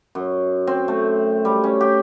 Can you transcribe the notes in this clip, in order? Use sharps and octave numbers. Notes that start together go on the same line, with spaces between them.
F#2
C4
A3
G3
C#4
G4